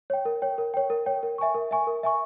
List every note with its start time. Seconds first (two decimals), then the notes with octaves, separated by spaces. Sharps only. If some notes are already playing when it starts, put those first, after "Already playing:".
0.10 C#5 G5
0.25 A#4
0.42 C#5 G5
0.58 A#4
0.74 C#5 G5
0.90 A#4
1.06 C#5 G5
1.23 A#4
1.38 E5 G#5 C#6
1.55 A#4
1.71 E5 G#5 C#6
1.87 A#4
2.03 E5 G#5 C#6